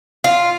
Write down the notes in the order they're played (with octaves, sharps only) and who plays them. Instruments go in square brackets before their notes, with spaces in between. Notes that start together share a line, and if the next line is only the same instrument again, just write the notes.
[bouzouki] F4